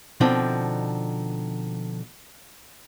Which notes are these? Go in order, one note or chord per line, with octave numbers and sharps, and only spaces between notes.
B2 D3 F3 C4 D4 D#4